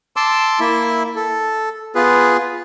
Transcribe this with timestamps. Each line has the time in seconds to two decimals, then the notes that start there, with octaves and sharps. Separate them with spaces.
0.16 A5 C6 D6 E6
0.60 A#3 E4 E5
1.16 A4
1.95 B3 F4 G#4 B4